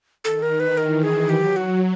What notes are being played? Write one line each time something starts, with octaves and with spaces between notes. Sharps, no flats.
D#3 A4
A#4
B4
E3 A#4
G#4
F#3 G4
F#4